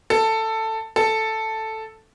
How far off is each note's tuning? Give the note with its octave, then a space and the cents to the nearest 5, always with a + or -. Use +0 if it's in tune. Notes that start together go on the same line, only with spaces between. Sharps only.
A4 +10
A4 +0